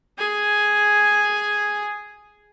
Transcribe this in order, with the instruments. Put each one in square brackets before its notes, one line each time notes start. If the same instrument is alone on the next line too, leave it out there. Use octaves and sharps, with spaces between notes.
[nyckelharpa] G#4 G#5